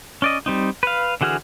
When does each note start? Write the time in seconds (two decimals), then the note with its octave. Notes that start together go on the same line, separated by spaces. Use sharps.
0.22 C#4 D5 D#5
0.46 G3 C4 D#4
0.83 B4 F5
1.21 D3 E3 F#4 G#4 F6